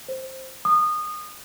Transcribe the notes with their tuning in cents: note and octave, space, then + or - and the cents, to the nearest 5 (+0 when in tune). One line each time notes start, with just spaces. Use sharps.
C5 +5
D#6 -25